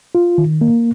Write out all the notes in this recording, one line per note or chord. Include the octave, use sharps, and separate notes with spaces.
F4
D#3
A#3